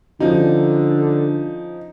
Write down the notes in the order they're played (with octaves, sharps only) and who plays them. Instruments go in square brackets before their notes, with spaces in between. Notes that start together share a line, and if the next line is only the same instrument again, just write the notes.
[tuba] D3 [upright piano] F3 C#4 D#4